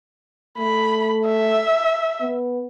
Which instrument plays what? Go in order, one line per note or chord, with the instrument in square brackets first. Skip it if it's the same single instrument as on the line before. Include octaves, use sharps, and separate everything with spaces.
[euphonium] A3 [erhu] B5
[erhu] E5
[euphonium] B3